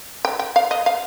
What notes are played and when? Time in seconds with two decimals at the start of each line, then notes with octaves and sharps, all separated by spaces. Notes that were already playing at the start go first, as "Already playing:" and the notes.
0.25 G5
0.39 G5
0.56 F5
0.71 D#5
0.86 F5